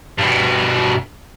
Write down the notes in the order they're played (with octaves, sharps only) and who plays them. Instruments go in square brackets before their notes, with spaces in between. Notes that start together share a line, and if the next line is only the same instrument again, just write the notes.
[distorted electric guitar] G2 B2